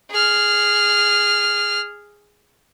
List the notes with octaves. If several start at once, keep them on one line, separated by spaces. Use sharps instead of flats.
G#4 F6